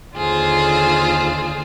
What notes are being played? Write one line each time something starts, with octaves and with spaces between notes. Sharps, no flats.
D#2 D3 F4 G#4 C5